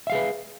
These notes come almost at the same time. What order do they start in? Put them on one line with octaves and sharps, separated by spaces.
E5 F5 G#4 B4